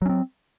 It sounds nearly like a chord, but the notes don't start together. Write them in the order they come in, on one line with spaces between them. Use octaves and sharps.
F#3 C#4 C4